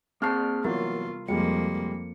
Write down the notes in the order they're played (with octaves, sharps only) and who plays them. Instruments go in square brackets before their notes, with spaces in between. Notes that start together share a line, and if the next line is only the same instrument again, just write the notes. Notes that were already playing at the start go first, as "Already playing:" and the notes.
[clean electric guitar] A#3 G#4 A5 [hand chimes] C4 C7 [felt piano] F6
[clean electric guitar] C2 [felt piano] E3 F#3 A#3 [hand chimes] B3 [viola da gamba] F4
[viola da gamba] F2 A#3 [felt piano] G3 G#3 [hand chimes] C#7